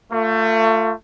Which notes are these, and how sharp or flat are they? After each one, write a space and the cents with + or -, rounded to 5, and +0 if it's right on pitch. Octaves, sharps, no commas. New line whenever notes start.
A3 +25 F4 +0